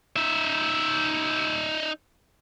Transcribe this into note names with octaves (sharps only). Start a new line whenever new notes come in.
D#4 E5